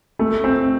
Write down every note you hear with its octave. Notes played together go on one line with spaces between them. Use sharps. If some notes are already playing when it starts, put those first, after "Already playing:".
A3
C4